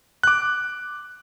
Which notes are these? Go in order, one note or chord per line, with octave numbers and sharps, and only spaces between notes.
D6 F#6